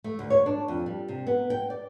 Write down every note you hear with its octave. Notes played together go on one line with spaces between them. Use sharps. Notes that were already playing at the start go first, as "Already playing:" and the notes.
A3
D2
C#5
D4
F2
G3
C3
B3
G5
D5